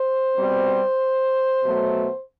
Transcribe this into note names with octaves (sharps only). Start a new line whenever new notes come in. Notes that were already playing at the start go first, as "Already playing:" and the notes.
Already playing: C5
B2 G3 C4
B2 F#3 A3